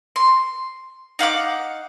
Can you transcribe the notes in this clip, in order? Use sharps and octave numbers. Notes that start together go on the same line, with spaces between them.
C6
D#4 F5 F#5 D6